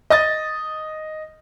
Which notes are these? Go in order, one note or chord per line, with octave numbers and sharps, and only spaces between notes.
D#5 D#6 A6